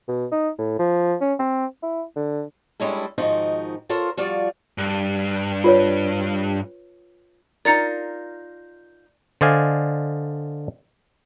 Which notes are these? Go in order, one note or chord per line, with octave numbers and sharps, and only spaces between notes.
B2
D#4
A2
F3
C#4
C4
E4
D3
G3 G#3 C#4 D4 E4 A4
G#2 D#3 F3 D#4 F#4
F4 A4 A#4 C5 C#5
F3 G3 F4 F#4 D5
G2
F4 B4 C#5
D#4 F4 A#4 D5 A6 C#7
D3 C5 D5 D#5 F5 G#5